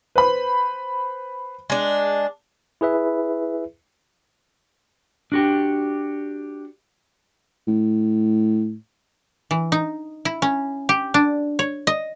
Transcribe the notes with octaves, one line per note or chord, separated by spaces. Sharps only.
B4 C5 B5
G#3 D4
E4 G#4 B4 E5
D4 F#4 G4
A2
E3
D#4
E4
C#4
G4
D4
C#5
D#5